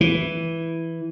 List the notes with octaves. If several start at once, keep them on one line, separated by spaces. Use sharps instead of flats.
E3